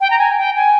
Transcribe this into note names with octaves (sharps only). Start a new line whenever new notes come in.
G5
A#5
G#5
G5
G#5